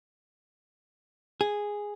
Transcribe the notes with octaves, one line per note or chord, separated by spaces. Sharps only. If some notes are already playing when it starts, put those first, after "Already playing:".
G#4